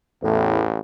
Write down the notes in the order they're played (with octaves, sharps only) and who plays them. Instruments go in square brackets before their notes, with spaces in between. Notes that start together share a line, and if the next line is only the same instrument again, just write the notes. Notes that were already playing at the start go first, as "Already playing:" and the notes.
[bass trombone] A1 [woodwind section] E2 A2